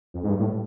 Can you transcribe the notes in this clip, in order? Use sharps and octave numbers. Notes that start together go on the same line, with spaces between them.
F2
G#2
G2
A2